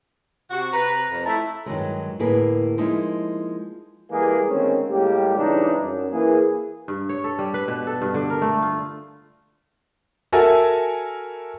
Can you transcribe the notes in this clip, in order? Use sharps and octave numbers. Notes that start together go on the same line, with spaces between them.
C3 F#4
C3 B4 A#5
F2
A3 E4 A5
G2 D#3 F#3 G#3
D2 A2 A#3 G#4 B4
F3 G#3 A#3 D#4 E4
E3 G3 G#3 A#3 G#4
D2 D#3 G#3 A#3 C4 C#4
A2 G3 G#3 A#3 G4
C#3 E3 G3 G#3 D4 D#4
F#2
E3 A#3 E4 G#4
G2
C#5
A4
G3
B4
B2
A4
G2
D3
A#4
A3
F4
F#4 A4 A#4 E5 G#5